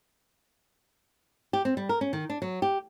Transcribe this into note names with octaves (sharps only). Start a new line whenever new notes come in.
G4
C4
G3
A#4
C#4
D#3
D4
F#3
G4